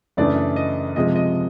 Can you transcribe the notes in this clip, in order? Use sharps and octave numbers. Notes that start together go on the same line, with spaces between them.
F#2 C#3 E3 A3 D4 D5
D#5
C3 F3 G#3 D#5
D#5